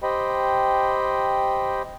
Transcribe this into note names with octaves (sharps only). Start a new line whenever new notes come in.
G4 C5 D#5 G5 B5